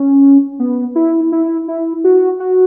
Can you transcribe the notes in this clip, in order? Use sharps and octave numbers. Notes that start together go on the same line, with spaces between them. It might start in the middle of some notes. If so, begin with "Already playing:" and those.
Already playing: C#4
B3
E4
E4
E4
F#4
F#4